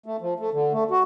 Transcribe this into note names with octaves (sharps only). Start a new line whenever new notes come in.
A3
F3
A3
D3
A3
F#4